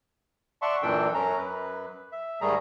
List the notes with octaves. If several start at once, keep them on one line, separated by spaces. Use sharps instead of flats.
D5 E5 F#5 A5 C6 C#6
F#2 A#2 E3 D4 A4 G5
F#2 C#4 A#5
F#2 B4
E5
G#2 D#3 G3 A3 G#4 A#5